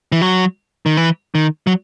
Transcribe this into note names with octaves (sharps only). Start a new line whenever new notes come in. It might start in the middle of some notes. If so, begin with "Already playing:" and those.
E3
F#3
D#3
E3
D#3
F#3